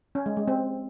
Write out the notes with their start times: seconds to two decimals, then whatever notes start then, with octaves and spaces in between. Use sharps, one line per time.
0.15 C#4
0.26 G#3
0.37 G#3
0.48 C4